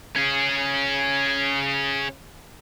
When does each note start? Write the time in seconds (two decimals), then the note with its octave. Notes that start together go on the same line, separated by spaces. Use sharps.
0.16 C#4 G#4